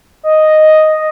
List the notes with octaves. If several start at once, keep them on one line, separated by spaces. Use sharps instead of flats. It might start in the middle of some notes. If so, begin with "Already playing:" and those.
D#5